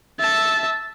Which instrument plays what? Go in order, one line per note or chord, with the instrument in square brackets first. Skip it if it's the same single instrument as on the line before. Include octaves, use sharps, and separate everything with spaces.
[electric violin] E5 A5